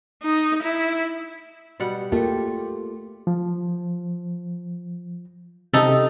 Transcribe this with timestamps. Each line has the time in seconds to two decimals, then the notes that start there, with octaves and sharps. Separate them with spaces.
0.23 D#4
0.63 E4
1.80 B2 G3 F#5
2.12 A3 A#3 F4 G4
3.27 F3
5.73 C3 D#4 G4 A4